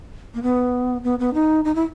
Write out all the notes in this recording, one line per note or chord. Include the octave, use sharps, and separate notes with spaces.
A#3
B3
B3
B3
D#4
D#4
E4